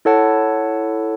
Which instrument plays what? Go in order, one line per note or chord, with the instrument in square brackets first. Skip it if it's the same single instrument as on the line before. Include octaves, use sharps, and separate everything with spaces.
[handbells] E4 A4 C#5 F#5 A5